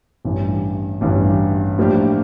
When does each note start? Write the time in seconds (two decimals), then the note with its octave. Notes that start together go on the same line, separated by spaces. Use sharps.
0.25 A1 G2 E3
1.01 A1 G2 E3
1.78 A2 F3 A#3 D4 G4